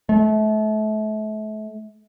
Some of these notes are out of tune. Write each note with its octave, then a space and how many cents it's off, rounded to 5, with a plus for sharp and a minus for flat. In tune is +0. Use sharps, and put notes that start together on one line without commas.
A3 -35